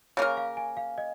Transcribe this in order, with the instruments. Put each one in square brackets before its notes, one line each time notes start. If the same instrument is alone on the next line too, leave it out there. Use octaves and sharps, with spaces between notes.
[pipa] C#3 A#3 C#4 A#4 [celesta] G#5
[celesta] F5
G#5
F5
D#5